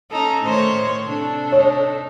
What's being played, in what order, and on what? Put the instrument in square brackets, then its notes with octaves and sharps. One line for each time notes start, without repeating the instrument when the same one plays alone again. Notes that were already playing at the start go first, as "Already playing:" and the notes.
[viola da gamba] C#4 D#4 [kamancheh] A4 A#5
[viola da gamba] A2 D#3 C#5 [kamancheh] C5
[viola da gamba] C3 [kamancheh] D4 A4
[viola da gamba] D#4 [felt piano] C#5